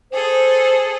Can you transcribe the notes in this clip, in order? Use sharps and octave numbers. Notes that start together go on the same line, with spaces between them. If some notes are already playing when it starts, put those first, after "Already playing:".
G#4 A4 C5